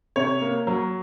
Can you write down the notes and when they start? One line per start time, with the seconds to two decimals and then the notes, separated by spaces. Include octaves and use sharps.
0.16 C3 C#5
0.41 A#3
0.67 F#3